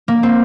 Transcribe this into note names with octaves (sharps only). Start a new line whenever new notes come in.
A#3
C4